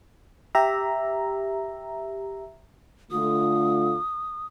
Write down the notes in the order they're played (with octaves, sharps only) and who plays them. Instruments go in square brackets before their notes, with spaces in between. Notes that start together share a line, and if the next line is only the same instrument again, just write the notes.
[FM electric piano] G4 E5 A#5
[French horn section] D3 A3 F4 [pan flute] D#6